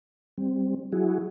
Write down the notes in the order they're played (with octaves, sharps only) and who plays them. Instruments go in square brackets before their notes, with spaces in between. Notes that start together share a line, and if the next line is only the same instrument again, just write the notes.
[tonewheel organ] G3 C4
F#3 E4 F#4 G#4